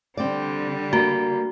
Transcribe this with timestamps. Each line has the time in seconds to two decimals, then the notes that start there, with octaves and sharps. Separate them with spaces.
0.17 D3 G3 C4 D5
0.93 A#3 F#4 A#5